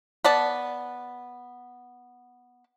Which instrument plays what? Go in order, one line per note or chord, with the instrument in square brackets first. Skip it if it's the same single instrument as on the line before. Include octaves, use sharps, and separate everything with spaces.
[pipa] B3 D5 A5